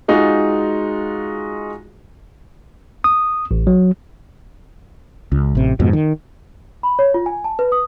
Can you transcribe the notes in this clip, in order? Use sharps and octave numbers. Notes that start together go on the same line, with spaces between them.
G#3 D#4 F4 F#4
D#6
A1
F#3
C#2
A1 C3
F2 G#2 B2
D#3
B5
C#5
F4
G#5
A5
B4
D#6